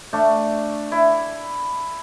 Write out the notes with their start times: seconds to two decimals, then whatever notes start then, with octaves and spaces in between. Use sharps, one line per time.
0.13 A3 D4
0.92 E4